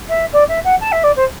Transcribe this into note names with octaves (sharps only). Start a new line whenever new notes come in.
E5
D5
E5
F#5
A5
E5
D5
C5